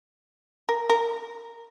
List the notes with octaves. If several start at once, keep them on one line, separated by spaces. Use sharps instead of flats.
A#4
A#4